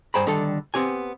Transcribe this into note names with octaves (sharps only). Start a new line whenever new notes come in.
G2 G#4 C5 G5 A#5 B5
D3 D#3 G3 A4
B3 C4 G4 G#5